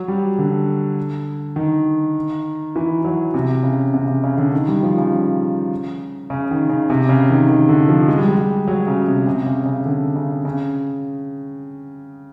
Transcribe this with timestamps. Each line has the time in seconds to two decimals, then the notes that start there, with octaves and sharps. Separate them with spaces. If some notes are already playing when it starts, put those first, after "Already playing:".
Already playing: F#3
0.08 G3
0.39 D3
1.56 D#3
2.76 E3
3.05 F#3
3.34 C3
3.63 C#3
3.94 C3
4.08 C#3
4.24 C#3
4.38 D3
4.53 D#3
4.68 G3
4.83 F3
4.98 C#3
6.30 C#3
6.51 D#3
6.69 C#3
6.90 C3
7.09 C#3
7.30 D#3
7.49 D#3
7.69 D3
7.88 F3
8.08 G#3
8.18 G3
8.28 G#3
8.37 G3
8.68 F#3
8.87 C#3
9.08 C3
9.27 C3
9.46 C#3
9.66 C#3
9.85 D3
10.16 C#3
10.45 C#3